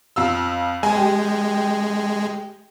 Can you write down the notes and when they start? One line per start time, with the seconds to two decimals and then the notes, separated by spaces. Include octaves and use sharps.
0.16 F2 F4 E6
0.83 G#3 G#5
0.97 G4